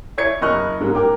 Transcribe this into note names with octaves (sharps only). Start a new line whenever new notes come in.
E4 C#5 D5 G#6 C#7
F#1 D#5 B5 C#6 F6 F#6
G#2 G#3 A#3 C#4
A#4 G5 D6